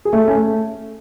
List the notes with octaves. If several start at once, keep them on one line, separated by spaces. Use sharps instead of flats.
G#4
A3
A4
C#4
A3